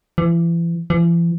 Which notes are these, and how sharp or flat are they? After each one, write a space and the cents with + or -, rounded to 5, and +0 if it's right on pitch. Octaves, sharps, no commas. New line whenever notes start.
E3 +35
E3 +45